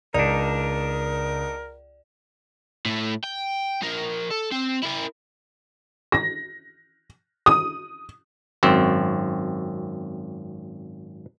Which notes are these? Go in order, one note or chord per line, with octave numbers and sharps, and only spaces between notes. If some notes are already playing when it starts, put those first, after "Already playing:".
C#2 D4 D#4 A#4 D5
A2 A3
G5
F3 A#4
A4
C4
E4 A#4
A#6
D#6
G#1 F#2 C4